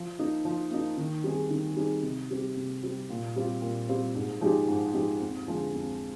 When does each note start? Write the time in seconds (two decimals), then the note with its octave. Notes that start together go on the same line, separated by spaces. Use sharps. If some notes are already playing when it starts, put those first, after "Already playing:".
Already playing: F3
0.19 A#3 D#4
0.45 F3
0.71 A#3 D#4
0.98 D#3
1.24 G3 C4 D#4 G#4
1.51 D#3
1.77 G3 C4 D#4 G#4
2.03 C3
2.31 G3 C4 G4
2.57 C3
2.83 G3 C4 G4
3.10 A#2
3.36 G3 C4 F4
3.62 A#2
3.89 G3 C4 F4
4.15 G#2
4.41 F3 G#3 D#4 G4
4.68 G#2
4.94 F3 G#3 D#4 G4
5.22 F2
5.48 D3 F3 G#3
5.75 F2